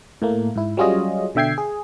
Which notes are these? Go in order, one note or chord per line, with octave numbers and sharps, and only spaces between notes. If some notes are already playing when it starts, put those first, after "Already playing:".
A2 A3 A#3
G#2 E4
F#3 G3 C#4 F4 G#4 D#5
B2 D3 E5 G5 G#6 C7
G#4